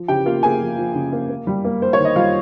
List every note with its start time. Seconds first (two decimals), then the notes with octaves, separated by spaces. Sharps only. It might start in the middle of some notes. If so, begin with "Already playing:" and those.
Already playing: F3
0.08 C#3 G4 G5
0.25 A#3 F4 F5
0.43 A#3 G#4 G#5
0.61 F3
0.78 F3
0.95 C#3
1.12 A#3
1.29 A#3
1.47 G3
1.64 A#3
1.81 A#3 C5
1.93 C#5
1.99 D#3
2.05 D#5
2.16 G3 F4 F5